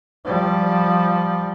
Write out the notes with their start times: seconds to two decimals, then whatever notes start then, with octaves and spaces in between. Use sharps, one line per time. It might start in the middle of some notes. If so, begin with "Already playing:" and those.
0.25 F3 G3